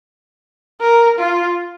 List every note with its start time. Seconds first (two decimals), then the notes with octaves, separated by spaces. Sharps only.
0.81 A#4
1.18 F4